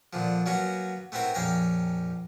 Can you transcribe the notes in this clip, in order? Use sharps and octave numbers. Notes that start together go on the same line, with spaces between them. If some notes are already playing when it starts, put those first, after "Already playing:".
A#2 D3 F3
F#3 A#3 B3 C#4 F#4
A3 B3 C4 E4 A#4
A#1 F2 C#4 F5 G5 A#5